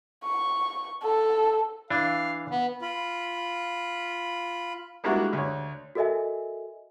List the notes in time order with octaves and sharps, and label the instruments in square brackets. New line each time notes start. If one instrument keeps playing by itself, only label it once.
[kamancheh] C#6
A4
[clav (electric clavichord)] E3 D4 [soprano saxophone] F5
[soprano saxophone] B3
[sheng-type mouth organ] F4 B5
[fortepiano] G3 G#3 A#3 D4 E4 F#4
D2 C#5
[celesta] F#4 A4 A#4 D#5 E5 G#5